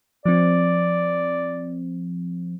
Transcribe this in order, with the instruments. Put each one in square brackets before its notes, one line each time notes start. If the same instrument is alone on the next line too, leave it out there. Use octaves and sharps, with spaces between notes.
[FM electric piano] F3 C4 [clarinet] D5